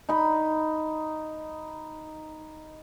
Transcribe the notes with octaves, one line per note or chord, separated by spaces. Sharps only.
D#4 B5